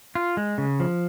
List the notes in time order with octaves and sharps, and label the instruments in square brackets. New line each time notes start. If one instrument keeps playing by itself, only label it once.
[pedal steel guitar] F4
G#3
C#3
F3